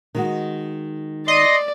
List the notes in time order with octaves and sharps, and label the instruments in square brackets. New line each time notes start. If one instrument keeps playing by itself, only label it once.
[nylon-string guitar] D#3 G#3 F#4
[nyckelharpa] D5 [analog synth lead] D#5 [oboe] C6